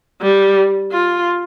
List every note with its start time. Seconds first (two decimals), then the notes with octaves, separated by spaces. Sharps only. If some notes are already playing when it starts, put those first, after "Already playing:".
0.21 G3
0.92 F4